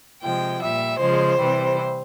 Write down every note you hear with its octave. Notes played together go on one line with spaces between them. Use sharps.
C3 F3 G#3 G5
A#2 G3 E5
C#3 F3 G#3 C5
C3 E3 G3